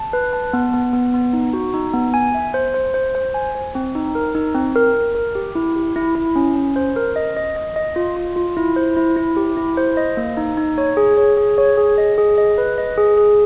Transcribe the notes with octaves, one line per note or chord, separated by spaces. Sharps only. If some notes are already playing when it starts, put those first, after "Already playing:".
Already playing: A5
B4
A5
B3
B3
B3
B3
D#4
F#4
D#4
B3
G#5
E5
C5
C5
C5
C5
G#5
C5
C4
D#4
A#4
D#4
C4
A#4
A#4
A#4
G4
E4
G4
E4
E4
C#4
C#4
C5
A#4
D#5
D#5
D#5
D#5
F4
F4
F4
E4
C5
E4
E4
G4
E4
C5
D#5
A#3
D#4
D#4
C#5
G#4
C#5
G#4
C#5
G#4
D#5
G#4
D#5
B4
D#5
G#4
G#4